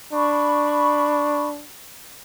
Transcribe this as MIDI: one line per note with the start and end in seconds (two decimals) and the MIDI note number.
0.13 1.65 62
0.13 1.47 83
0.13 1.47 85